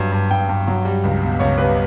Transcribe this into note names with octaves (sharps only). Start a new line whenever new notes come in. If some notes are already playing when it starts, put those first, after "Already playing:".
Already playing: G2 F#3
G2
G2 G5
G2
F#3
G3
C#2
B2
C#2 C#5
G3 B4